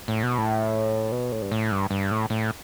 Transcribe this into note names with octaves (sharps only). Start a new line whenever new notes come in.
A2
B2
A2
B2
A2
G2
A2
G2
G2
A2
A2